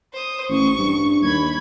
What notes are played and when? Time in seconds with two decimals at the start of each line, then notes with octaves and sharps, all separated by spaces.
0.13 C5 D#6
0.50 A1 C#6
0.79 G2
1.23 D#2 B5 G#6